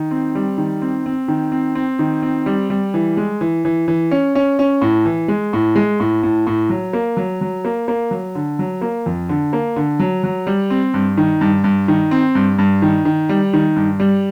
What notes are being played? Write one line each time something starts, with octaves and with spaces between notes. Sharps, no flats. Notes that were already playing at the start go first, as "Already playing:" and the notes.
Already playing: D#3
C4
G3
D#3
C4
C4
D#3
C4
C4
D#3
C4
G3
G3
E3
G#3
E3
E3
E3
C#4
C#4
C#4
A2
E3
G#3
A2
G#3
A2
A2
A2
F#3
A#3
F#3
F#3
A#3
A#3
F#3
D3
F#3
A#3
F2
D3
A#3
D3
F#3
F#3
G3
C4
G2
D#3
G2
G2
D#3
C4
G2
G2
D#3
D#3
G3
D#3
G2
G3